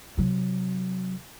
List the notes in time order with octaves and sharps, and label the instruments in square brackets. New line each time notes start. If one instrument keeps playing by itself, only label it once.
[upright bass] C3 F#3